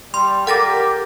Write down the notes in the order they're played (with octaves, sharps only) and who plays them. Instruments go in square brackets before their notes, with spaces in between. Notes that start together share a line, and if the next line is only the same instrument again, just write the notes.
[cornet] G3 [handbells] C6
[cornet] G4 [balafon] A4 G5 D6 [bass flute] A#4 [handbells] F#5 A6 A#6